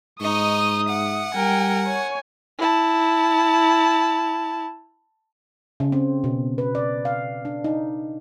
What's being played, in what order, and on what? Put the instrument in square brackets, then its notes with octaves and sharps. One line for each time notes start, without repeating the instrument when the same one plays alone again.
[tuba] G#2 [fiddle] D#4 D#5 [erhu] C#6 [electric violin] D#6
[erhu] E5 [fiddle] F#5
[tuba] G3 [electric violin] A#4 G#5 [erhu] G5
[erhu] C#5 [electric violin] G#5
[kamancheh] E4 A5
[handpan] C#3
C4
B2
B4
D5
F5
D4
D#4